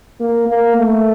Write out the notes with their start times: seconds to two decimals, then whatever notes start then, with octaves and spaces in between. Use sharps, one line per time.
0.20 A#3
0.48 A#3
0.77 A3